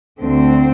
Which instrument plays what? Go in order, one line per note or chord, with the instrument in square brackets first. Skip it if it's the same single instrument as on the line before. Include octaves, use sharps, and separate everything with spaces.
[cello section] D2 D3 C4